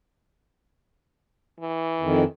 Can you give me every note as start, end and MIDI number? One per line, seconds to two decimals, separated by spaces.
1.60 2.25 52
2.00 2.24 41
2.00 2.24 51